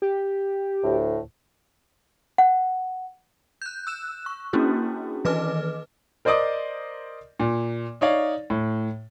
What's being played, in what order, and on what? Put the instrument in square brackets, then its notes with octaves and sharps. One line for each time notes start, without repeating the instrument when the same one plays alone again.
[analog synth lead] G4
[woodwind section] D2 A2
[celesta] F#5
[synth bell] F#6 G6
E6 F#6 E7
C#6
A#3 C#4 D4 E4 F#4 G#4
D#3 E3 B4 D#5 D6 F6
[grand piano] A#4 C5 D5 D#5 D6 D#6
A#2
D#4 C#5 D5 F5
A2